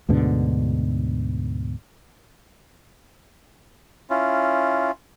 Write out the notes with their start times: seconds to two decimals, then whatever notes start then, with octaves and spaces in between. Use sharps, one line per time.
0.09 D2 G#2 B2 D3
4.10 C#4 E4 F4